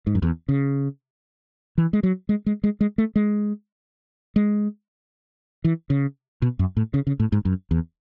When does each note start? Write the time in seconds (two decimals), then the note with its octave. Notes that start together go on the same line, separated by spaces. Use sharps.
0.07 G#2
0.15 F#2
0.22 E2
0.49 C#3
1.78 E3
1.93 G#3
2.03 F#3
2.29 G#3
2.46 G#3
2.64 G#3
2.81 G#3
2.98 A3
3.16 G#3
4.36 G#3
5.64 E3
5.90 C#3
6.42 B2
6.59 F#2
6.77 A2
6.94 C#3
7.07 C#3
7.20 A2
7.32 G#2
7.45 F#2
7.71 E2